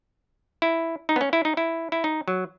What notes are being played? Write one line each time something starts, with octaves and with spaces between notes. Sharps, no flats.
E4
D#4
B3
C#4
E4
D#4
E4
E4
D#4
F#3